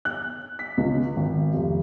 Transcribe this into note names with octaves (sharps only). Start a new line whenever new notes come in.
F#6
B6
C#2
G#1
F1